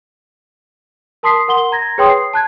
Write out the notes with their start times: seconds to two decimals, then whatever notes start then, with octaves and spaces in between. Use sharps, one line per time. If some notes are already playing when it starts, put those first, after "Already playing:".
1.23 A#4 A5 C6 D#6 B6 C7
1.48 A#4 F#5 C6 G7
1.72 A#5 G#6 A#6
1.98 G#4 B4 C#5 G5 C6 D#6
2.10 C7
2.33 A5 F#6 G#6